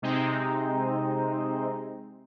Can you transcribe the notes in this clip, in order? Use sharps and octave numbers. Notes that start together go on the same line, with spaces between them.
C3 G#3 C4 D#4